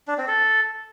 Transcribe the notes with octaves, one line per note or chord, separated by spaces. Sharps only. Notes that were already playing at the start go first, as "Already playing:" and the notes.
D4
C4
A4